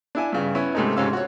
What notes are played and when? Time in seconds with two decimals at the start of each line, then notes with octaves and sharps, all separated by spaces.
0.15 D4 E4 G#5
0.33 G2 C#3
0.55 B3 C#4 E4
0.75 G#2 C3 A3 C#4 D#4
0.96 G#2 C3 C#4 F5 E6
1.13 F#4 C#5